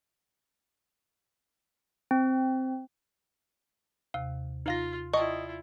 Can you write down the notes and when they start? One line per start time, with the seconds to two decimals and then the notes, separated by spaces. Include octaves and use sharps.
2.11 C4
4.14 D#2 C3 F5
4.66 D#4 F4 F5 A#6
5.14 E4 F4 D5 D#5 G5 A5 C#6